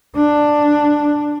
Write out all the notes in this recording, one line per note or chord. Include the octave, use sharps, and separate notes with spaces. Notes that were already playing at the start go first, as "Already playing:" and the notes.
D4